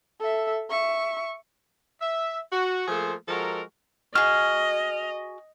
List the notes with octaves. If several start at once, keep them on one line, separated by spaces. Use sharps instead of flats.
A4 E5
E5 C#6
E5
F#4
F3 A3 A#3 G#4 A4 C5
F3 G#3 F#4 A4 A#4
F#4 G#4 D#5 F6